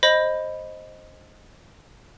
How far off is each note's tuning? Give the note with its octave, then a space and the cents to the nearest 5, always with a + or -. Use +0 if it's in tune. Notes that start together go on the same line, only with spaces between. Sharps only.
C5 +10 D#5 +0 B5 +5